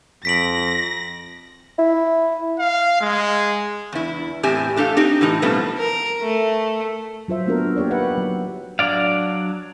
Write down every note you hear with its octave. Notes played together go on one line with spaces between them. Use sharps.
F2 A#6 B6 D7 F#7
E4
F5
G#3
E2 E4
E2 A2 C4 G4 E5 G#5
A3 D4 G4 A4 F5
C4 D#4 G4
A2 E3 D#4
B2 F3 G3 A3 B3 C4
A#4
A3
F#3 F4 C5 E5
A#3 B3 D4 F#4 A4 A#4
A#3 G4 C#5 D5
D#4 B4 E5 F#5
F#3
F#3 D4 D5 F5